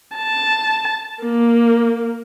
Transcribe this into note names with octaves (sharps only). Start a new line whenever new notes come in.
A5
A#3